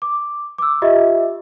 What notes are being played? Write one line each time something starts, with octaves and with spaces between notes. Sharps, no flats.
D6
D6 E6
F4 G4 D#5 E5